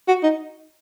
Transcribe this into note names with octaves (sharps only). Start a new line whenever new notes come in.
F#4
D#4